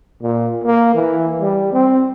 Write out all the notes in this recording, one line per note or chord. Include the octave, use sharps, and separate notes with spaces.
A#2
A#3
E3
G3
C4